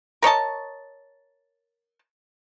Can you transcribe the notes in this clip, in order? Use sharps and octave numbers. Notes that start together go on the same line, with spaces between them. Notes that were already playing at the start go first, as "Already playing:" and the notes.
A#4 C#5 D#5 A5